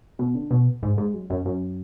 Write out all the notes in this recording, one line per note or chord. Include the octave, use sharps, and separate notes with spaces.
B2
D3
B2
G#2
G#2
F#2
F#2
F#2